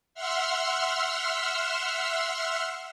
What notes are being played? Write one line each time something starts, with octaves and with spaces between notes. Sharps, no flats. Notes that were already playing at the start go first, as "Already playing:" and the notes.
E5 F#5 C6 E6 F6